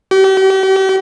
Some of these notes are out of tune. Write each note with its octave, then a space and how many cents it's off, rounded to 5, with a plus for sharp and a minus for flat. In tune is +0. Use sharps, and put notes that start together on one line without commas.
G4 -40